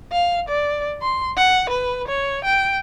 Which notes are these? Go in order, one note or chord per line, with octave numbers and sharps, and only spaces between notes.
F5
D5
C6
F#5
B4
C#5
G5